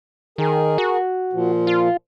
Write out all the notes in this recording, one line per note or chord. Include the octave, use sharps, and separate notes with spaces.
D#3 G#4 A#4
F#4
A#2 F3
F4